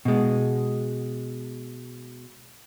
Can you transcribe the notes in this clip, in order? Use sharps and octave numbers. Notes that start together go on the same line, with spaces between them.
B2 G#3